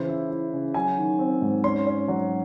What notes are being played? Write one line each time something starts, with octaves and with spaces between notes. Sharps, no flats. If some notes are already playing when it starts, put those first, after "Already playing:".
Already playing: C#3 E3 C5
E4
E4
C#3
F#3 G#5
D#3
C4
G#2
C#4 C6
C#4
F#3